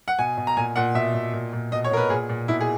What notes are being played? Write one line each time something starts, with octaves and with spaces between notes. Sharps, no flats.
F#5
B2 G#5
B2
A#5
A#2 G#5
A#2 F#5
B2 E5
B2
A#2
A#2
B2 D#5
C#5
B2 A#4
B4
A#2 G#4
A#2
B2 E4
G#4